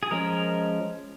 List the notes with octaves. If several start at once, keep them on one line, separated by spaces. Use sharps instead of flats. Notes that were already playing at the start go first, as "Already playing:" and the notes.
G#4
F3 G#3 C#4 A#4